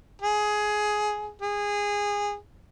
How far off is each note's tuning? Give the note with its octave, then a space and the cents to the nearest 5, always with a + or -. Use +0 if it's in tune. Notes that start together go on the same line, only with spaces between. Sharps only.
G#4 +15
G#4 -20